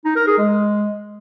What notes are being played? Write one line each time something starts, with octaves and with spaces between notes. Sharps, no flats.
D#4
A#4
G#4
G#3